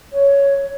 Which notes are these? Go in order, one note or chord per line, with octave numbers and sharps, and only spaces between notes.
C#5